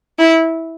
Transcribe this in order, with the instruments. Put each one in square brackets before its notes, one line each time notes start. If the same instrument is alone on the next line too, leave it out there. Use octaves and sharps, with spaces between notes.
[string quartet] E4